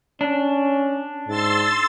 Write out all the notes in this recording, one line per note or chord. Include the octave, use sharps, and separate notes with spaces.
C#4 D4
G#2 C6 E6 A6